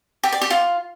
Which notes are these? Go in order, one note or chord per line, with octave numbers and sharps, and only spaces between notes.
G4
D5
G4
F4